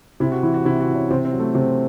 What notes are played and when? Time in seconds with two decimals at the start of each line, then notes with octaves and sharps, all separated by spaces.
0.20 C3 E4
0.32 F#4
0.43 E3 E4
0.54 F#4
0.65 C3 E4
0.80 F#4
0.88 E3
0.95 C#4
1.11 C3 C4
1.25 C4
1.32 F#3
1.39 A3
1.55 C3 C4